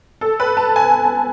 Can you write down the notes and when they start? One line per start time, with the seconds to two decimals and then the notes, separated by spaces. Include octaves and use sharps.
0.21 A4
0.40 B4
0.57 A5
0.76 G#5